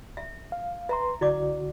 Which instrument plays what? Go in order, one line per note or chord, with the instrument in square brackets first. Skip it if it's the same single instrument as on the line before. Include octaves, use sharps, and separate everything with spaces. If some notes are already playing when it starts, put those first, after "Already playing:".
[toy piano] E5
[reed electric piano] F5
[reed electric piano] B4 C6 [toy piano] E5 A#5
[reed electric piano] C2 D3 F#4 [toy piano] E4 D5 D6